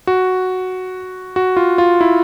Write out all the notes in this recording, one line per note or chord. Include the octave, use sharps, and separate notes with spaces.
F#4
F#4
F4
F4
E4